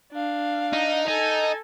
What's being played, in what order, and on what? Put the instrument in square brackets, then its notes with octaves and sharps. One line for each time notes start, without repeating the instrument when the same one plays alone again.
[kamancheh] D4 F5
[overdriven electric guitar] D#4
[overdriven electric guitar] D#4 [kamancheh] A4 G#5